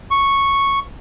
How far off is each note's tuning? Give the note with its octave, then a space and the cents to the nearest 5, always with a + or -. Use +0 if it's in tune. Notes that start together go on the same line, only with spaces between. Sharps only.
C#6 -5